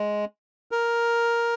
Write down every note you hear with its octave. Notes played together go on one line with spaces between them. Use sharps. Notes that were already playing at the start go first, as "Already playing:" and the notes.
Already playing: G#3
A#4